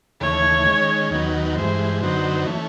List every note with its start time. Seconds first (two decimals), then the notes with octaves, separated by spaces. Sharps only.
0.21 D#2 C#3 E3 A3 C#5
0.66 D#3 G#3 C#4
1.10 D#2 D#3 F#3 B3
1.56 G2 E3 G#3 C5
2.01 F#2 D3 F#3 B3 D#4 C5
2.46 E3 A3 C#4